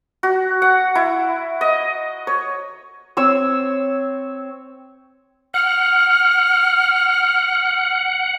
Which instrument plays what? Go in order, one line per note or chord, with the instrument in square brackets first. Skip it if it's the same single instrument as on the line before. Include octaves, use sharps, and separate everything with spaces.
[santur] F#4
F#5
E4
D#5
C#5
C4 C#5 E6
[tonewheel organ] F#5 [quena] F6